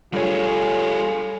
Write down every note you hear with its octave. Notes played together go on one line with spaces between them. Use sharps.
G2 G3 F4 G#4 A4 C#5